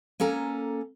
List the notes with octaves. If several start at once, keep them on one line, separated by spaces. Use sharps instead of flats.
A#3 C#4 A4 G#5 A#5